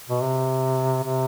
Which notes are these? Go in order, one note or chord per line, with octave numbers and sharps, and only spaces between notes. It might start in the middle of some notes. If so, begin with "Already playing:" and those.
B2
C3
C3